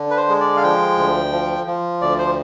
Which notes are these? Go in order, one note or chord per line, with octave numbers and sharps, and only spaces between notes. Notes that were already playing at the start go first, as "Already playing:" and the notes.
Already playing: D3
B4
C5
G#3
D5
F5
F3 G5
D2
F3
F3
D2 D5
C5